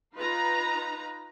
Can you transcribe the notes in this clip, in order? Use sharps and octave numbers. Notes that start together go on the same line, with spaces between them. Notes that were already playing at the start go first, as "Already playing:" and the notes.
D#4 F4 B4 A#5